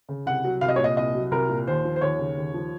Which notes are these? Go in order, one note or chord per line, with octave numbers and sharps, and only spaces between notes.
C#3
C2 F#5
F#3
C2 F5
D#5
C#5
A#2
D#5
C2 D#5
F#3
C2 A#4
A#2
D#2 C5
F3
C5
D#2 C#5
C#3
D#2
F3